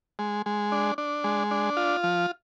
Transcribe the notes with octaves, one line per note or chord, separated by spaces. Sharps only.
G#3
G#3
D4
D4
G#3
D4
F4
F3